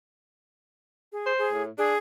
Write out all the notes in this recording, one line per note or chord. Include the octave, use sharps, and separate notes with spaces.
G#4
C5
G#4
A2
D4 G#4